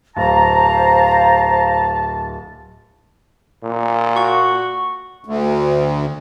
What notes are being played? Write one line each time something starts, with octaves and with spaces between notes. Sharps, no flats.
D1 C5 F5 A5 A#5
A#2
F#4 C#6
D2